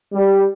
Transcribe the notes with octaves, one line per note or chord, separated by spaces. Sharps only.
G3